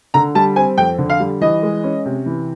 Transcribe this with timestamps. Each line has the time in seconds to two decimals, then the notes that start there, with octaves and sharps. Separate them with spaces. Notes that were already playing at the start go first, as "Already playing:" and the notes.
0.14 D3 A#5
0.35 G3 A5
0.56 C4 G#5
0.78 F2 G5
0.98 D3
1.10 F5
1.20 G3
1.41 E3 D#5
1.63 G#3
1.84 C#4
2.05 C3
2.26 E3